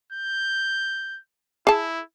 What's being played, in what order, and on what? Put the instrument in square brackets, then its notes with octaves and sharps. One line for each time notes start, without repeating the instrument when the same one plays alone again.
[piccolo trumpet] G6
[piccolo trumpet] E4 [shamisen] G#4 A5